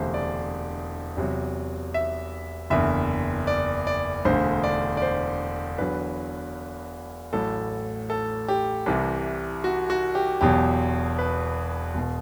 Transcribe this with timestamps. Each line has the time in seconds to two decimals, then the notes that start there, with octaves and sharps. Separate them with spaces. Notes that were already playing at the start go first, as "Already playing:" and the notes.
Already playing: E1 D2 C3 E3 C5
0.14 D5
1.17 E2 C3 F#3
1.94 E5
2.70 F#1 E2 D3 E5
3.47 D5
3.87 D5
4.25 E1 D2 D3 C5
4.64 D5
4.97 D5
5.02 C5
5.78 E2 D3 F#3 B4
7.33 A1 A2 F#3 A4
8.10 A4
8.48 G4
8.86 C2 C3 E3
9.64 F#4
9.90 F#4
10.15 G4
10.41 E1 E2 B2 F#3 G4
11.19 B4
11.95 E1 B2